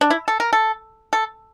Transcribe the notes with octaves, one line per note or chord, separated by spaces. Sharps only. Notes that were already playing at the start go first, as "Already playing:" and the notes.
D4
E4
A4
A#4
A4
A4